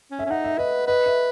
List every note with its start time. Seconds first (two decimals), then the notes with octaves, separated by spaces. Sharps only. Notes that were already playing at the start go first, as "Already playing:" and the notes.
0.11 C#4
0.19 E5
0.26 C#4
0.31 D#4 F#5
0.44 E5
0.58 B4 D#5
0.87 B4 D#5
1.06 E5